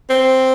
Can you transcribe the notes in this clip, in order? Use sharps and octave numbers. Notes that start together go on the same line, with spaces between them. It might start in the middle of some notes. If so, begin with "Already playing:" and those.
C4